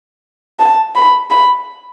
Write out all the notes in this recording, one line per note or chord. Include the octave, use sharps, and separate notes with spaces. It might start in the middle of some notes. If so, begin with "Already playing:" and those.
A5
B5
B5